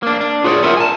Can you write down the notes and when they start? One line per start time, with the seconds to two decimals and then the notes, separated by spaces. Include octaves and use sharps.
0.03 A#3 D4
0.21 D4
0.44 F4 G#4 B4 C#5 D5
0.63 B3 E4 F4 A#4 E5 F#5
0.77 G#5 A5